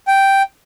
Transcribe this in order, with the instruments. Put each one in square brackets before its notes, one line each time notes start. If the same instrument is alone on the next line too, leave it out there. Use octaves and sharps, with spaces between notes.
[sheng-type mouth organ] G5